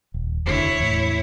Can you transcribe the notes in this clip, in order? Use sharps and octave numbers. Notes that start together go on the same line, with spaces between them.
D#1
F1 B2 D3 E4 C#5
E2 A2